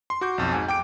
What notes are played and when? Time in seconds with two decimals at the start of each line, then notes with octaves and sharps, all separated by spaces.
0.10 C6
0.21 F#4 D6 G6
0.38 B1 F2
0.52 G#2 G#5
0.68 G5 D6 D7